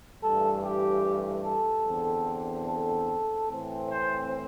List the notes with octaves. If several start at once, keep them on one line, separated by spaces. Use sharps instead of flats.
G2 E3 A3 A4
G4
A4
E2 D3 C4
A4
A2 E3 C4
C5